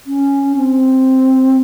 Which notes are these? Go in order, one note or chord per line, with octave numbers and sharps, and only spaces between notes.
C#4
C4